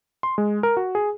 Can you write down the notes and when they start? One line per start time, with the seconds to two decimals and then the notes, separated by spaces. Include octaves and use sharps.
0.23 C6
0.38 G#3
0.63 A#4
0.77 F#4
0.95 G#4